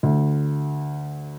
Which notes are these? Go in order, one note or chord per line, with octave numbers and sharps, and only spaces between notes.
D2